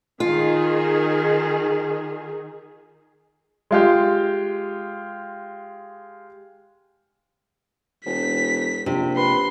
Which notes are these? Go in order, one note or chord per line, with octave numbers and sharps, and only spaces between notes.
D#3 F4 G#4
G#3 F4 G4
E1 B6
A#1 C3
B4 C6